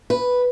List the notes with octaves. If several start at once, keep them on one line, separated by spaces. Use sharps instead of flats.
B4